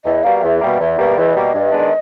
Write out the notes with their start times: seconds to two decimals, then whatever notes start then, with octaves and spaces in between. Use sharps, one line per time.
0.05 E2 D#5
0.24 B2 G3 A#3 F5
0.42 E2 E5
0.60 B2 G3 A#3
0.79 E2
0.97 B2 G3 A#3
1.16 E2 D#5 E5
1.35 B2 G3 A#3
1.54 G2
1.72 D#3 G#3 B3 D4